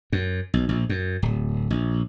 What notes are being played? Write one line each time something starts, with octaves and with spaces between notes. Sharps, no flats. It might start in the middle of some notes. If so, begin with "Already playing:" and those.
F#2
B1
A#1
F#2
D1
A#1